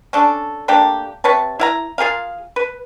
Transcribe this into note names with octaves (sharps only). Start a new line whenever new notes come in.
C#4 D4 A4
A3 A#3 D4 G4
C3 B4 C#5 A5
E4 F5 A#5
F4 G#4 A#4 F5
B4